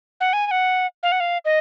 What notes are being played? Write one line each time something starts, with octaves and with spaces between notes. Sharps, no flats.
F#5
G#5
G#5
F#5
F5
F#5
F5
D#5